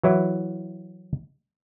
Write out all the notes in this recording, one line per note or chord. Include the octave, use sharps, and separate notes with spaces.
E3 F#3 E4